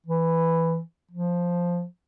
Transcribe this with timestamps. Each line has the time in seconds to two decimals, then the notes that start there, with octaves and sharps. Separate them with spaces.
0.06 E3
1.11 F3